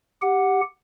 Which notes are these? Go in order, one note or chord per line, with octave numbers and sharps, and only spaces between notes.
G4 F#5